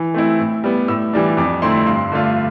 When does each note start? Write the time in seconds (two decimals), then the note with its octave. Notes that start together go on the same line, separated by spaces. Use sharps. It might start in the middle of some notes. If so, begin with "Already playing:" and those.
Already playing: E3
0.14 A3 C4 E4
0.39 A2
0.64 G3 B3
0.88 A2 E6
1.13 E3 G3 D4
1.37 F2 D6
1.62 D3 A3 C4 E4 C6
1.87 G2 C6
2.12 D3 A3 D4 F4